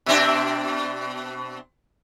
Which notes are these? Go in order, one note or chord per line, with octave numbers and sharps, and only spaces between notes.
B2 C4 D4